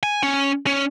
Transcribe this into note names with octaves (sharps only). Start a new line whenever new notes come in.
G#5
C#4
C#4